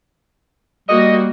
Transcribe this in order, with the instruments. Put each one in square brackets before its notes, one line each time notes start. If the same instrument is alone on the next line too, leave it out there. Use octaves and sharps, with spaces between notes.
[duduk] G3 [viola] A#3 F#4 [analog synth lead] D#5